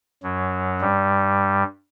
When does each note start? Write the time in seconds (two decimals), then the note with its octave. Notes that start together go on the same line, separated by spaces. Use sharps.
0.23 F#2 F#3
0.81 G2 G3